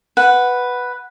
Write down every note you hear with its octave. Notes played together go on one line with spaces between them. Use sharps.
B4 F#5